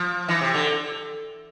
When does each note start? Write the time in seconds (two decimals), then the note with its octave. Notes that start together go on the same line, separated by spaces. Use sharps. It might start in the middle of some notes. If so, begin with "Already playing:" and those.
Already playing: F3
0.28 E3
0.41 C3
0.54 D3